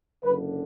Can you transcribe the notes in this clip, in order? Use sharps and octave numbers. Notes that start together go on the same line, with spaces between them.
F#1 F#2 D3 B4